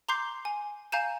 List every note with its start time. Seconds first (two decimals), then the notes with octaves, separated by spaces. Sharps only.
0.09 A#5 C6 D6 G6 C7
0.45 G#5
0.92 F5 G#5 A#5 G6 D#7 E7